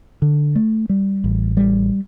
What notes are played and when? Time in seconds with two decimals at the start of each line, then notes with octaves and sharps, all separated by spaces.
0.22 D3
0.56 A3
0.89 G3
1.24 A1
1.57 G3